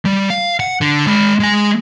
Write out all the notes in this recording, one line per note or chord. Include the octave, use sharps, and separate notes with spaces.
G3
F5
F#5
D3
G#3 B5
G#3 G#5